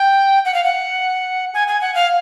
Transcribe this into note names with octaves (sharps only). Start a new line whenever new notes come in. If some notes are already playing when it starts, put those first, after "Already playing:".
Already playing: G5
F#5
F5
F#5
G#5
G#5
F#5
F5